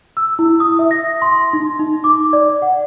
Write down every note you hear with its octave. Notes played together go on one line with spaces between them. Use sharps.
E6
E4
D#6
E5
A#6
C6
D#4
D#4
D6
D5
F#5